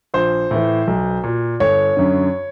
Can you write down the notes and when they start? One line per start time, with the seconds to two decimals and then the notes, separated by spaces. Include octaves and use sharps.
0.14 A#1 C5
0.51 A2 E3
0.87 B1
1.24 A#2
1.60 G1 C#5
1.97 F#2 D3